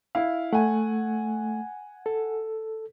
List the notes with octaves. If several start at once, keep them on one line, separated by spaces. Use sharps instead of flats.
E4 F5
A3 F#5 G#5
A4